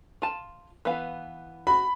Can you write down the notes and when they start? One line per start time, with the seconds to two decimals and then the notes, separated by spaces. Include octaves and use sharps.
0.22 F4 A5
0.85 E3 B3 F5
1.67 F#4 B5